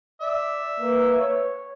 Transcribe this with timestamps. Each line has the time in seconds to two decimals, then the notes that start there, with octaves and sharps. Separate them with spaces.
0.22 D5 E5
0.80 A#3 B4
1.19 C#5